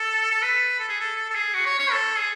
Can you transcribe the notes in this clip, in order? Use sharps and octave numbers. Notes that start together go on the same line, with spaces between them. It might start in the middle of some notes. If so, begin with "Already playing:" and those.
Already playing: A4
A4
B4
A4
G#4
A4
A4
A4
G#4
F#4
C#5
C#5
A4
G#4